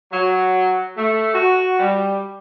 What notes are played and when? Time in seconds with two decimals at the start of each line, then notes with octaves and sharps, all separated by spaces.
0.12 F#3
0.97 A3
1.34 F#4
1.78 G3